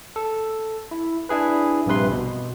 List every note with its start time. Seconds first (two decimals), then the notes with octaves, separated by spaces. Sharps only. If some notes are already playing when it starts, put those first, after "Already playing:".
0.16 A4
0.91 E4
1.29 D4 E4 G#4 B4
1.86 A#1 G2 C3 B4 C6
2.12 B2